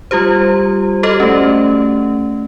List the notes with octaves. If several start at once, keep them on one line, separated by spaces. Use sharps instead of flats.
G3 F4 G4 C5
F#4 G4 A4 C5 D#5
A3 C#4